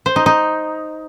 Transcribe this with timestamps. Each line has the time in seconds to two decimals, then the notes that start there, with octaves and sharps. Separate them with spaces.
0.06 C5
0.16 D#4
0.26 D#4